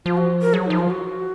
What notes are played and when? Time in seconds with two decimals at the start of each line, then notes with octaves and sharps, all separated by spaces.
0.06 F3 F4
0.17 F#4
0.42 A#4
0.53 F#3 G#4
0.66 F3 D#4
0.78 F4
0.90 F#4